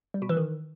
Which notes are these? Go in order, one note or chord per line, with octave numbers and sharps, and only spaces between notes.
G3
B2
E3
D#3